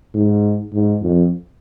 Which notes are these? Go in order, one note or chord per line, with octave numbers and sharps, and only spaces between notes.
G#2
G#2
F2